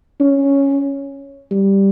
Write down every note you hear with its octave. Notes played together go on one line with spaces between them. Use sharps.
C#4
G3